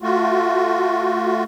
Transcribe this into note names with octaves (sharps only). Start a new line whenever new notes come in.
A3 F4 F#4